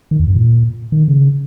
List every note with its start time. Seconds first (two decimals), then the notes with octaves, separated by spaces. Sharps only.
0.11 D#3
0.19 E2
0.27 G2
0.35 A#2
0.92 D#3
1.08 C#3